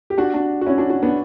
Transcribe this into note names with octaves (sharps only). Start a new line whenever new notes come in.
G4
D4 F#4
D4 F#4
F#4
C#4 E4
D4 F#4
D4 F#4
B3 D4